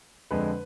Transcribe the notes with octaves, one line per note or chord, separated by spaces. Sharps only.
F2 D3 G#3 B4